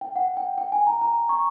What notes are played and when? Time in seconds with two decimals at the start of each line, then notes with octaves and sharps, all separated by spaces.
0.01 G5
0.16 F#5
0.37 G5
0.58 G5
0.72 G#5
0.87 A#5
1.01 A#5
1.29 C#6